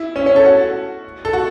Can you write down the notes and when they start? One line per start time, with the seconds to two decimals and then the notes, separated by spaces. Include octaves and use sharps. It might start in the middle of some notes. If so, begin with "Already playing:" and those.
Already playing: E4
0.16 C#4
0.26 C#4
0.36 A4
0.45 F#4
1.25 A4
1.33 F#4